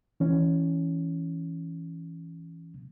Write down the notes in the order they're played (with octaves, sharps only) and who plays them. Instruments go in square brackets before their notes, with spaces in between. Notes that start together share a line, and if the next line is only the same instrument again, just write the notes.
[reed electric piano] E3 C#4